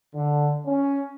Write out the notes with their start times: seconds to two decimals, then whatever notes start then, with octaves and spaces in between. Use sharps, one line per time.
0.13 D3
0.66 C#4